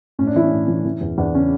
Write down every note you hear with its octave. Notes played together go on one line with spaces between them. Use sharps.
A2 C#4
D4
E3 E4
C#4
A2
E3
E3
E2
E2 D4
C#3 C#4